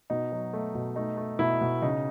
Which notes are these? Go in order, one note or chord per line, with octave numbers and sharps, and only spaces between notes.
B2 D#4
F#3
A3
B2
A3 D#4
A3
B2 E4
B2
C#3 D#4